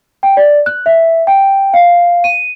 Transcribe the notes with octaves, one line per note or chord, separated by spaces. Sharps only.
G5
D5
F#6
E5
G5
F5
D#7